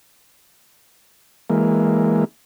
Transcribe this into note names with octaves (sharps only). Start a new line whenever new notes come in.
E3 G#3 A#3